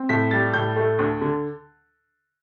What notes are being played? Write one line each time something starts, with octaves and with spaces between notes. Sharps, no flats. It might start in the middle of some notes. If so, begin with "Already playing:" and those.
Already playing: C4
A2 B6
G3 A6
A2 G6
A3
D2
D3